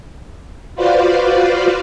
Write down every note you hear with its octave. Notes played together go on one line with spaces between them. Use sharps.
F4 F#4 B4 C5 D5 F5